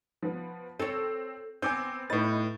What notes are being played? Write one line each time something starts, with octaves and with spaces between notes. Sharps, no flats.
F3 B3
C4 A4 C#5
B3 C4 G#5 D6 G6
A2 D#4 B4 A6